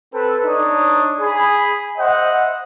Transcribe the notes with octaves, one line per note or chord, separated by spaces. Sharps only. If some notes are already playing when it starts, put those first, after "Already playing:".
C4 A4 B4
D4 D#4 C#5 D#6
G#4 B5
C5 D#5 E5 F#5